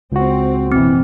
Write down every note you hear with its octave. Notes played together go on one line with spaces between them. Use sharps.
C#2 C4 F#4
F#1 B2 E3 C4